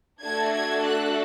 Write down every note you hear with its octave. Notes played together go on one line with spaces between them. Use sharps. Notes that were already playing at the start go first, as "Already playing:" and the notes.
A3 D4 F#4 A4 G#6
G#6
F#6